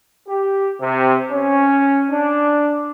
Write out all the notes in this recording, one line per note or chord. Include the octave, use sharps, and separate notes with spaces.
G4
C3
C#4
D4